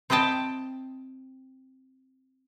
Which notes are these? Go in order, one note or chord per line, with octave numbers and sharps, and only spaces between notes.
C4 E4 D#5 G5 A5